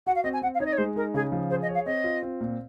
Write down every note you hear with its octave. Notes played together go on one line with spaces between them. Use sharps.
F#4 F#5
F5
C4 D#5
G#5
C4 F#5
F5
D#4 C#5
D#5
C#5
G#3 C5
D#4 A#4
C#3 G#4
F3
G#4 C5
D#5
C#5
F5
C4 D#5
F4
C4
A#2